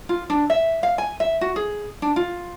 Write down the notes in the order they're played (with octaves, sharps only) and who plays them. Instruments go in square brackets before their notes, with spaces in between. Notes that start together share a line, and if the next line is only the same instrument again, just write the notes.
[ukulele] F4
D4
E5
F5
G#5
E5
F#4
G#4
D4
F4